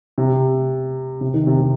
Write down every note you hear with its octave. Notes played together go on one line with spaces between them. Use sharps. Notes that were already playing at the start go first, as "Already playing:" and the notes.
C3
C3
D#3
C3
C3